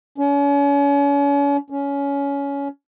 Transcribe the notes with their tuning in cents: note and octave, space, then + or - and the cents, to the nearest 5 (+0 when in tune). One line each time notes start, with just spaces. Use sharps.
C#4 +40
C#4 +20